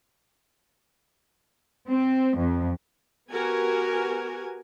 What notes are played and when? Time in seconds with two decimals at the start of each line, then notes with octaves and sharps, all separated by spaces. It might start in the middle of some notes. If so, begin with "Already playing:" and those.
1.88 C4
2.36 F2
3.29 B3 F#4 G4 A#4 G#5